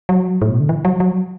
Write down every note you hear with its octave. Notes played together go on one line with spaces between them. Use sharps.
F#3
A2
B2
D3
E3
F#3
F#3